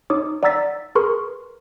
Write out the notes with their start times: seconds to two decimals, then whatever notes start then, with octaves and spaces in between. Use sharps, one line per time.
0.10 D#4 C#5 D6 D#6
0.43 D5 F#5 A#5 E6 A6 B6
0.95 G#4 A#4 B4 C6 C#6 F6